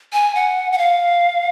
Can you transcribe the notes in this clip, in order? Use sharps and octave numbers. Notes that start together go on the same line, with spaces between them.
G#5
F#5
F#5
F5